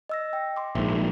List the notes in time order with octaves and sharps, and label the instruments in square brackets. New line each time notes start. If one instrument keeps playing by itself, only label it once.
[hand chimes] D#5 E6 A#6
G5
C6 D6
[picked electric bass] A#1 G#2 [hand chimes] E5